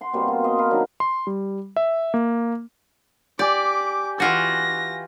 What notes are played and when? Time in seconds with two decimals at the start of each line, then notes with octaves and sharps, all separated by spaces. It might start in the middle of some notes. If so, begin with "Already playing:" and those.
0.01 F#5 C6
0.13 B2 G3 A#3 C4
0.28 F4
0.44 C5 D#5 F5
0.58 F#4 A#4 B4 F5
0.71 D#3 F#3 D4 D#4
1.00 C6
1.27 G3
1.76 E5
2.14 A#3
3.39 G4 D5 G#5 D6
4.20 E3 F4 F#4 A#6